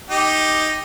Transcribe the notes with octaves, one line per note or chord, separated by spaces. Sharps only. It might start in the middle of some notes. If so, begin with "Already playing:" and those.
D#4 G4